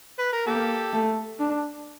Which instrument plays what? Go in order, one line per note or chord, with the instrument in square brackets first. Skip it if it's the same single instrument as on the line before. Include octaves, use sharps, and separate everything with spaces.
[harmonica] B4
A#4
[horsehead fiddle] A#3 [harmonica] G4 A4
[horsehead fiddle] A3
D4